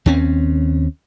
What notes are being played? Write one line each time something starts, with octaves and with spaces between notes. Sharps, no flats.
D#2 C4 C#4